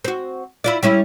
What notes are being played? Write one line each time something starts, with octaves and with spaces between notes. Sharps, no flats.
C4 F#4
E4 F4 D5
G3 C#4 E4